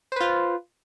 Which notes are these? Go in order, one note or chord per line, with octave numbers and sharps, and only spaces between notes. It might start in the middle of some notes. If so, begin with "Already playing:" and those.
F4 B4 C5